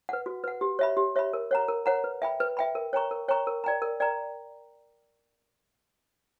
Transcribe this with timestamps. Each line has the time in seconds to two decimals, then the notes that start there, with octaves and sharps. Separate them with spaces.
0.09 B4 F#5
0.26 F#4
0.44 B4 F#5
0.61 G4
0.79 C#5 E5 B5
0.97 G4
1.16 C#5 E5 B5
1.33 A#4
1.51 C#5 F#5 A#5
1.68 A#4
1.86 C#5 F#5 A#5
2.04 B4
2.22 E5 G5 B5
2.40 B4
2.57 E5 G5 B5
2.75 A#4
2.93 C#5 G5 A#5 C#6
3.11 A#4
3.28 C#5 G5 A#5 C#6
3.47 A#4
3.64 D5 G5 A#5
3.82 A#4
4.00 D5 G5 A#5